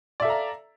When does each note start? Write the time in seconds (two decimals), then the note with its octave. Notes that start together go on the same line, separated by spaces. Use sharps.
0.20 D5
0.22 E5
0.25 A4
0.27 F5
0.30 A#5